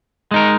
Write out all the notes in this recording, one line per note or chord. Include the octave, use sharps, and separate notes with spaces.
G#3 D#4 A#4